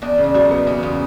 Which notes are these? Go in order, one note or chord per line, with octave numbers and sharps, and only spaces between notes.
E2 D4
C#3
D4
F#3 E4
D#4
B3
E2 E4
C#3 F4